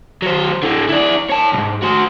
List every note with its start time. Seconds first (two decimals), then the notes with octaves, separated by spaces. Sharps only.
0.22 F#3 C5
0.62 A2 D3
0.89 E4 D5
1.30 C#5 A5
1.53 B1 G#2
1.83 F#4 C5